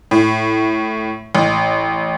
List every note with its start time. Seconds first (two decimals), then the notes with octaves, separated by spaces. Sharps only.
0.11 A2
1.35 A1